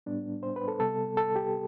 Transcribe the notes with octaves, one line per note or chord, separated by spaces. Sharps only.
A2 G3 B3 D4
C5
B4
A4
C3 G3 B3 A4
A4
G4